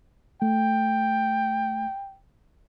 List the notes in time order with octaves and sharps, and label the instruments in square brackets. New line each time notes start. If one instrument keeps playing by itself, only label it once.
[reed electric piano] A3 [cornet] G5